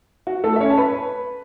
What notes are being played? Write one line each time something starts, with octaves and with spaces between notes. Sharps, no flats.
F#4
A3 A4
E5
C#4 C#5
A5
B4 B5